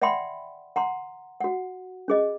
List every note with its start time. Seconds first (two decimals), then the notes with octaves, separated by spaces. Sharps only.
0.02 D5 E5 F#5 G5 B5 C6
0.76 F#5 A#5 C6
1.40 F#4 F#5
2.08 C#4 G#4 D#5